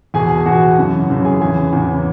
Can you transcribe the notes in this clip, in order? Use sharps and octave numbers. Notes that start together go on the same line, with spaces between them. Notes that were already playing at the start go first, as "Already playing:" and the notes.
E2 B2 G#4 G#5
E2 B2 F#4 F#5
F#2 C#3 E3
F#2 C#3 E3
G#4 G#5
E2 C#3 E3 G#4 G#5
E2 C#3 E3